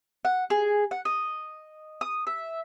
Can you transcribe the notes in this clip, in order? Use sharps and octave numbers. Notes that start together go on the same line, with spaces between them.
F#5
G#4
F#5
D#5
D#6
E5